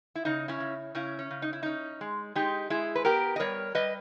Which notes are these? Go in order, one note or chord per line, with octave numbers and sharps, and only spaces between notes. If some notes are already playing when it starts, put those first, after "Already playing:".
E4
C#3 D#4
C#4 E4
C#3
C#3 C#4 E4
C#4
C#3
D#4
E4
C#4 D#4
G#3
G#3 D#4 G4
G#3 E4 G#4
B4
B3 G4 A#4
D#5
G3 A#4 C#5
G3 B4 D#5